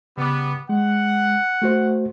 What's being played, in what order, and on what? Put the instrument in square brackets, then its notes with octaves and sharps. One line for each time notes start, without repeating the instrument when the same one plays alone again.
[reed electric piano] C#3 D6 [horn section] G3 B3
[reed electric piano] G#3 [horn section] F#5
[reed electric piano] A3 F#4 C5